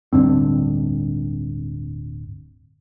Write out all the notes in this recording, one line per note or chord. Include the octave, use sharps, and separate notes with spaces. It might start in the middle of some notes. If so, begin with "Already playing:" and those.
D1 G2 D3 C4